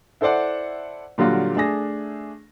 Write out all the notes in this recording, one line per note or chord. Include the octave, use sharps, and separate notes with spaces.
E4 A4 C5 D5 F#5
A#2 D3 F#3 G3 F4 F#4
A3 D4 G#4 A#6